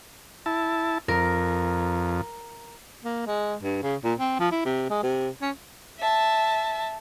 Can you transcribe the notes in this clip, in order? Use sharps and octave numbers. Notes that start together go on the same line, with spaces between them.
E4 A5
F2 A#4
A#3
G#3
G2
C#3
A#2
C4
F3
E4
C3
G#3
C3
C#4
E5 A5